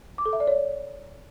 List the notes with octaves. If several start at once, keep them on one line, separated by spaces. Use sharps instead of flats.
D6
A4
E5
D5
C#5